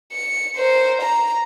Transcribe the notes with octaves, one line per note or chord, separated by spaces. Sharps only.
C#7
A#4 C5
A#5